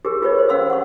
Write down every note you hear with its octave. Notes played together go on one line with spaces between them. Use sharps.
G4 G#4 A#4
F4 G4 A#4 B4 C#5 D#5
G4 C5
C#4 F5 C6 E6
F#5 C#6